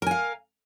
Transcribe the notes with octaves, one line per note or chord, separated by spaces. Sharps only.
A#4 F5 G#5